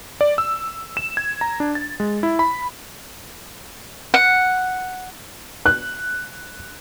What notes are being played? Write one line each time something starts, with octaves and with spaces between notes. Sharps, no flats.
D5
E6
E7
G#6
A#5
D4
A6
G#3
E4
B5
F#5
F#6